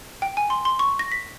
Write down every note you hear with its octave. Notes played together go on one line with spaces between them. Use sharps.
G5
G#5
C6
C6
C#6
A#6
B6